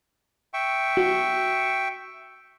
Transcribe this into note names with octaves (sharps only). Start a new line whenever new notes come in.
E5 G5 C#6
F#4